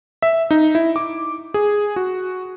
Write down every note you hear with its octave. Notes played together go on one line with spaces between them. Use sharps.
E5
D#4
E4
D6
G#4
F#4